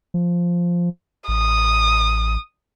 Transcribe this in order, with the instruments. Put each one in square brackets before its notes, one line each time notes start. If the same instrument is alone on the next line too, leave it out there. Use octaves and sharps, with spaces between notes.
[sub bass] F3
[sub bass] A1 [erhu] D#6